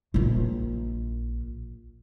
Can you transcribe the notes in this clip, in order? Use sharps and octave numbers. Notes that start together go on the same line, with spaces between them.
A#1 F4